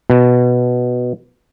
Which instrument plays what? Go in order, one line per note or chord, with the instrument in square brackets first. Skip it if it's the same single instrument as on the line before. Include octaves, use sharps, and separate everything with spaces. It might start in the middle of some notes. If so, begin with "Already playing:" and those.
[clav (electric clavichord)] B2